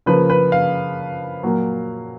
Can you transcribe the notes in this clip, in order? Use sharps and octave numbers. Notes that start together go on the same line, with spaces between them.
C#3 F3 A#3 B4
B4
F5
A#2 F#3 A#3